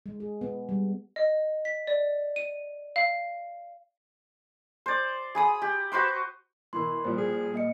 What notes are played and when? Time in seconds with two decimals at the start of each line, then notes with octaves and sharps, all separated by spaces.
0.06 G#3
0.20 G#4
0.41 B3
0.69 G3
1.16 D#5
1.65 B6
1.87 D5
2.36 D#7
2.96 F5
4.86 C5 D5
5.35 G#4 B5 D#6
5.62 G4
5.92 F#4 B4 C5 G5
6.73 B2 E3 A#4 B5 C6
7.05 A#2 F3 G3 C5
7.18 G#4
7.54 A#3 D#5 C#7